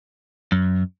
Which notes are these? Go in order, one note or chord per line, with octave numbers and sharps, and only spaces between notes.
F#2